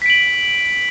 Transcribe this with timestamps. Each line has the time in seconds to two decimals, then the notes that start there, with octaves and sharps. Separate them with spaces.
0.02 B6
0.06 D7
0.10 F#7